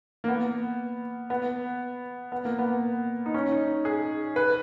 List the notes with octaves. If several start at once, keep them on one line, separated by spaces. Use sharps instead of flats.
A#3
B3
B3
B3
A#3
B3
D#4
C#4
D#4
G#4
B4